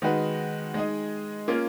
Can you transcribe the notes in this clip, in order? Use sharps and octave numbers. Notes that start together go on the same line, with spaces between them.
D#3 G#3 D#4 F#4 B4
G#3 D#4 G#4 D#5
A#3 C#4 F4